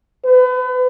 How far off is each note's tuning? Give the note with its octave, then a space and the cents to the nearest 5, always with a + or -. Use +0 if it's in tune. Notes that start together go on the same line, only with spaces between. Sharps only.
B4 +35